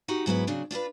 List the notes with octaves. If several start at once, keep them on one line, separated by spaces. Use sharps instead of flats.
D#4 F#4 G4
G#2 F#3 B3 E4
C#3 F#3 C4 D4
D4 F4 G4 B4